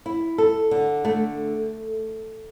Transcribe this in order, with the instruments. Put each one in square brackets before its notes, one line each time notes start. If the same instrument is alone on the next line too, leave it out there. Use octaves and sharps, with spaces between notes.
[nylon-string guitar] E4
A4
D3
A3